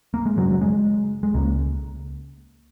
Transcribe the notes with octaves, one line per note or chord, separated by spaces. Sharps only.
A#3
G#3
F#1 F#2 C#3 F#3
F#3
G#3
G#3
C#2 C#3 A#3